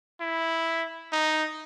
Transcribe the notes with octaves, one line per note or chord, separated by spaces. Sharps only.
E4
D#4